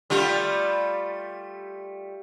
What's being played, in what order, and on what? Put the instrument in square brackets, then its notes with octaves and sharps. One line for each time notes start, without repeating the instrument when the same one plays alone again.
[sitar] G3 A3 F4